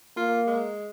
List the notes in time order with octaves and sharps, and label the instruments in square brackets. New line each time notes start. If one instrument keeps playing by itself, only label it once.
[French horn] A#3 [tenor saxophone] F4
[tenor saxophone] G#3